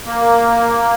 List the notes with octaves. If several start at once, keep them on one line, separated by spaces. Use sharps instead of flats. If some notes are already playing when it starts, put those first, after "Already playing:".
A#3